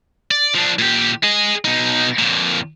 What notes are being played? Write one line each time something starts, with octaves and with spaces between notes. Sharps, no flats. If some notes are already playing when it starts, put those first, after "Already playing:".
D5
F3 D4
A#2 G4
G#4 D#5
B2 D#4
F2 A#2